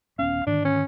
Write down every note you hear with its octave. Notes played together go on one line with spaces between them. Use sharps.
D#1 B3 C#4 F5
G#2 D3 D#3 D4
C#4